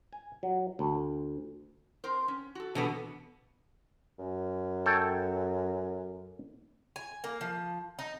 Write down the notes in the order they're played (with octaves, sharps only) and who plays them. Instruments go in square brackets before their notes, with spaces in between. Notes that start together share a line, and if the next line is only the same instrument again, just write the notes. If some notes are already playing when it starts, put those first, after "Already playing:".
[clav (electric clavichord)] G#5
F#3
D2
[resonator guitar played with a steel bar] C4 A#4 C5
C#4
F#4 A4
[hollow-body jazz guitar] B2 D3 B3 [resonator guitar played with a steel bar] E3
[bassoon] F#2
[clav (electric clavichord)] A4 C#5 G5
[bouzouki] G#5
A#3
F3
D#4